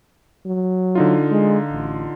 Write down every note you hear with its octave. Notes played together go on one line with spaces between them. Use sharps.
F#3
D3 D#4 F4
G#3
A1